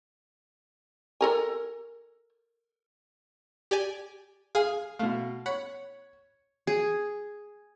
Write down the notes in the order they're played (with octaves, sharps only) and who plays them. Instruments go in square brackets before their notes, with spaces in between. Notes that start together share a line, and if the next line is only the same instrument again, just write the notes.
[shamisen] A4 A#4 G#5
[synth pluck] G4 D5 G#5
[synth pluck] G#4 G#5 [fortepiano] F5
[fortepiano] B2 F5 [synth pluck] A3
[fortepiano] C#5 [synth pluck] F#5 B5
[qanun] G#4